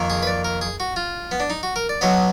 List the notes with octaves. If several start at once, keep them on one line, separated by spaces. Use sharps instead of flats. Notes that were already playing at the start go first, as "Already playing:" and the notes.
Already playing: F2 D#3 A#3
G#4
B4
D5
A#4
G#4
F#4
F4
B3
D4
D#4
F#4
A#4
D5
B1 B2 F#3 B3 D#5